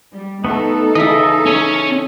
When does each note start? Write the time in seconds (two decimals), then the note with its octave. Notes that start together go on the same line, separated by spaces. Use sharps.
0.13 G3
0.44 A3 B3 D#4 A4
0.95 C#3 E3 D#5 E5
1.46 C#4 C#5